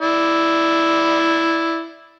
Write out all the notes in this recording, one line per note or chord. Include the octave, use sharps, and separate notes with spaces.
E4 D5